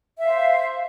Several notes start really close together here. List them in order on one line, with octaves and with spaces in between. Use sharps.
E5 F5 C5